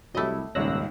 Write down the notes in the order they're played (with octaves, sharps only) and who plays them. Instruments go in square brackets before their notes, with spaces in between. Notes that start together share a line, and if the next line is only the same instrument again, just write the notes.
[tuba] C2 [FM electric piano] F#3 E4 G4 [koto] A3 D#5
[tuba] D#1 [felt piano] G#1 C#2 C#5 [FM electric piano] E6 F#6 A#6